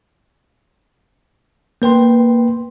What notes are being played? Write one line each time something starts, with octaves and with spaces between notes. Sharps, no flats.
A#3 B4 G5 C6